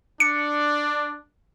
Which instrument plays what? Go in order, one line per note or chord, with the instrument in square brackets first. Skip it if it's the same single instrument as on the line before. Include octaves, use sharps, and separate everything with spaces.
[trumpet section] D4 [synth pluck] C#7